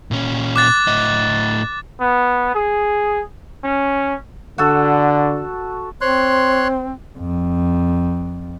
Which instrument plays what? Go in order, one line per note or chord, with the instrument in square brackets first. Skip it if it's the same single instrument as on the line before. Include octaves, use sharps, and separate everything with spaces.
[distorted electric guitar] A#2 C#4
[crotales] D6 F#6 A6
[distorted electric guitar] A2 D#5
[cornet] B3
G#4
C#4
[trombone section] D3 [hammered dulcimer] F#4 A4
[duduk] C4 [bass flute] C5 [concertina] C#5 C6 F#6
[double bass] F2